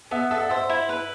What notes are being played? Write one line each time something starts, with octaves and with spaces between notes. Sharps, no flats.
B3 E5
A4 E5
F#5
C5 E5
E4
B4